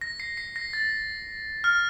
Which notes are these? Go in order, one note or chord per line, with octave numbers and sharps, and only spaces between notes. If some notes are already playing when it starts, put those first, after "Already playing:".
A#6
C7
C7
A#6
A6
F6